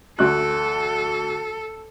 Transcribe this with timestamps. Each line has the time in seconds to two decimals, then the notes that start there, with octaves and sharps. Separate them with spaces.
0.19 D2 A4 F#6